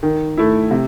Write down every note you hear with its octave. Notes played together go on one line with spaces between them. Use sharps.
D#3
A3 E4
C3